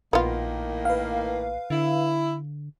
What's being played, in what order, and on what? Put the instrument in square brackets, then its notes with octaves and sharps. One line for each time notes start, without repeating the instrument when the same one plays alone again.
[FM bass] A#1 [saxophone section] A2 D#3 A#3 [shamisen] B3 F4
[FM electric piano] B4 F5
[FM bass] D3 [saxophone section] E4